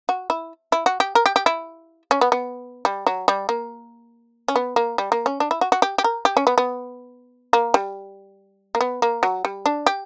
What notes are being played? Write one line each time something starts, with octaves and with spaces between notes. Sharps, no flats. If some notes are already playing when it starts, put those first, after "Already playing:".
F#4
E4
E4
F#4
G4
A#4
G4
G4
E4
C#4
B3
B3
G3
F#3
G3
A#3
C#4
B3
A#3
G3
A#3
C#4
D4
E4
F#4
F#4
G4
G4
A#4
G4
C#4
B3
B3
A#3
G3
A#3
B3
A#3
F#3
G3
D4
G4